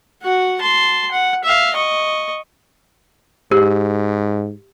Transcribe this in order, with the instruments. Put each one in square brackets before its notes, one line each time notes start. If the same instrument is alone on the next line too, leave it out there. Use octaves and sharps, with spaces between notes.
[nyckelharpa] F#4 F#5
A5 C6
F#5
E5 F5
D#5 C#6
[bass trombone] G#2 [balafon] G4